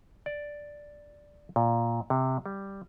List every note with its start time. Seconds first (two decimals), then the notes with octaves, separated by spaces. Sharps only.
0.26 D5
1.56 A#2
2.10 C3
2.46 G3